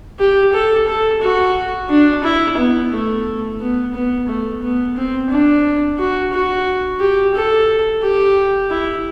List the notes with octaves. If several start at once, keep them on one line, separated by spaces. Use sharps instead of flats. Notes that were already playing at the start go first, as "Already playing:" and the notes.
G4
A4
A4
F#4
D4
E4
B3
A3
B3
B3
A3
B3
C4
D4
F#4
F#4
G4
A4
G4
E4